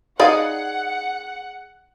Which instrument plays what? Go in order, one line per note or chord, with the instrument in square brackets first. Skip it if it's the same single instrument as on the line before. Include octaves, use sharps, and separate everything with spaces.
[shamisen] D#4 D5 F5 [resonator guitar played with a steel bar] G#4 D#5 [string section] F#5